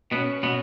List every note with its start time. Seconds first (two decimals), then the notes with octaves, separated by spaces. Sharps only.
0.12 B2 B3 C#4
0.43 B2 B3